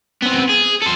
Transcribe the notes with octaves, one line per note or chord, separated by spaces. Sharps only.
B3 C4
G#4
A4 C5